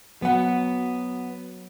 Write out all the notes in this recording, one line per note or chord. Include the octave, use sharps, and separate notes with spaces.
F#3 B3 F#5